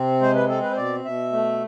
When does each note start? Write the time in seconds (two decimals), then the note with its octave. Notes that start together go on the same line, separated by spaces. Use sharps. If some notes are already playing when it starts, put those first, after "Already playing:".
Already playing: C3 C4
0.21 G#3 C5
0.35 B4
0.49 C4 A4
0.63 B4
0.71 C5
0.76 B2 D5
1.05 B2 E5
1.32 A3